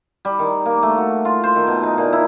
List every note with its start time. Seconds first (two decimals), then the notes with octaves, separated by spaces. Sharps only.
0.25 G3
0.39 D#3
0.66 A#3
0.83 A3
0.98 F#4
1.25 F4
1.44 C5
1.56 D#3
1.67 B2
1.83 D#4
1.98 A#2
2.13 E4